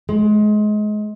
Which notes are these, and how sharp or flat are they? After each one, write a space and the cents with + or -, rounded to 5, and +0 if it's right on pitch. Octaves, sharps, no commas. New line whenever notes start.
G#3 +25